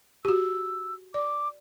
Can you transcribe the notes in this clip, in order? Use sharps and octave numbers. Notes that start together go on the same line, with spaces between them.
F#4 G4 E6
D5 D6